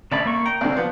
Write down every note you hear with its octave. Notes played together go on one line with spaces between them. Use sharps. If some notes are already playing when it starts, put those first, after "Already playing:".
A1 D3 A5 B5
A#3 C#6
G5 A#5
C2 D3 C5
F3 B3